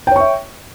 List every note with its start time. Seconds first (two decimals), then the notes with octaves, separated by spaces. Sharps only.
0.07 G5
0.11 C#5
0.16 C#6
0.20 E5